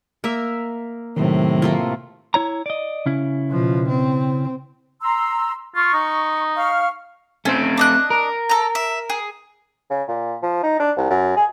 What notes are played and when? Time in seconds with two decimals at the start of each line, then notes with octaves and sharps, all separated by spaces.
0.24 A#3 A#4 E5
1.17 A2 C3 D#3 F#3
1.62 A3 A#3 F4
2.34 E4 C#5 A#5
2.66 D5 D#5
3.06 C#3 C#4 E4
3.48 B2 F3
3.88 C4
5.02 A#5 C6 E6
5.75 F4 C#6
5.93 D#4
6.57 F5 C#6 F6
7.45 A3 C4 C#4 C5
7.77 D4 D#5 F#6
8.10 A#4
8.49 A4 A#5
8.75 E5
9.10 G#4
9.90 C#3
10.08 A#2
10.42 F3
10.63 D#4
10.79 D4
10.97 C2
11.10 F#2
11.36 G#4